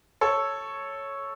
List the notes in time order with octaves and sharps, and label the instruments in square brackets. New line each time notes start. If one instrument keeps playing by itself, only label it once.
[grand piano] A4 C#5